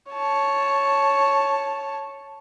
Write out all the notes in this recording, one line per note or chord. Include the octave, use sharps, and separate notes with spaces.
C#5 A5